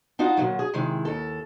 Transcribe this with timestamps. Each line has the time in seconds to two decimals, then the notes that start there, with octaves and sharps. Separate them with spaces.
0.19 D4 D#4 F4 F#4
0.37 A#2 D3 D#3 F#3
0.59 G#4
0.74 C3 D#3 G#3 E4
1.05 D#2 A4